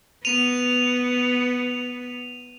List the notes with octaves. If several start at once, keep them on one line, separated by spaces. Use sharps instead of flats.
B3 D#7 F7